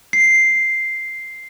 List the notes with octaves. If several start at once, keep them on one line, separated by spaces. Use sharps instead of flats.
C7